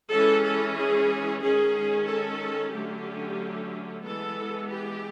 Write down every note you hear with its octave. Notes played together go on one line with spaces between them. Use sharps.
E3 G#3 C#4 A4
A4
G#4
D#3 G#3 C#4 G#4
A4
D3 F#3 A3 C#4 G4
E3 G#3 B3 A4
G4